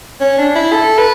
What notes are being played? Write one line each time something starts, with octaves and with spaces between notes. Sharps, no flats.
C#4
D4
E4
A4
B4